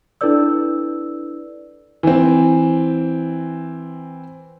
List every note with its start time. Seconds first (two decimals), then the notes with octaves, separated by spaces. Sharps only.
0.21 D4 E4 A4 B4 D5 E6
2.03 E3 C4